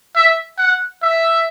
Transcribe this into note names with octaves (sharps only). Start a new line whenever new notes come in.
E5
F#5
E5